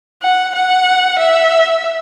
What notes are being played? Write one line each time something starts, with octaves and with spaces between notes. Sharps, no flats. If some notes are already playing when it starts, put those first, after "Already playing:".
F#5
F#5
E5